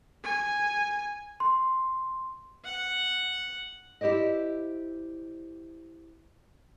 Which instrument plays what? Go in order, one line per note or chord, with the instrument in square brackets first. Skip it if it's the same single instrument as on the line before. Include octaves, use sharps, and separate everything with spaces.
[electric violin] G#5
[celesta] C6
[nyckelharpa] F#5
[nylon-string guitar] E4 G4 C5 D5 D#5